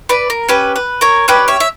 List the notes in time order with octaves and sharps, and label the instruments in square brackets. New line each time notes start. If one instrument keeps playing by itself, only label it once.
[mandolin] B4 D5
A#4
C#4 G4 B4
B4
A#4 C#5
C#4 G4 B4 D5
C#5 E5
E5